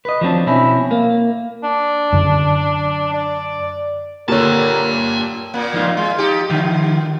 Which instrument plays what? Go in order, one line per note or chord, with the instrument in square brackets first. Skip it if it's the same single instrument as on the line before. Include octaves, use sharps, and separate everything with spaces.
[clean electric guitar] B4 D#5
F3 F#3 C4 D4
B2 C4 C#4 E4
A#3
[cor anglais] D4
[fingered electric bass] F#2 D3
[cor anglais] D5
[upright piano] A#2 D3 [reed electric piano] G4 C#5 [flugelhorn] A#4 [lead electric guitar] G5 A5
[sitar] A#2 A#3
[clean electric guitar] F3 D#4 F4
[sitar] G#3 [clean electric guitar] F4
[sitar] D#4 G4
[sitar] D3 [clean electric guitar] D#3 F3